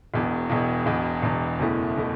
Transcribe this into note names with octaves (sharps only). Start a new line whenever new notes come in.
E1 E2 B2
E1 E2 B2
E1 E2 B2
E1 E2 B2
F#1 E2 B2 A3 E4
B2 A3 E4